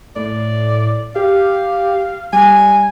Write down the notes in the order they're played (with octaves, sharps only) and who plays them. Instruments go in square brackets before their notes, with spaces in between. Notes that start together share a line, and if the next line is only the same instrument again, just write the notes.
[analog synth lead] A2 [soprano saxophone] D5
[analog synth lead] G4 [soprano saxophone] F5
[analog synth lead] G3 [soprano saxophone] G#5